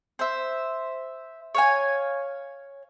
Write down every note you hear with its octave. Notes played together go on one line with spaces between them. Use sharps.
C5 E5
C#5 F5 G#5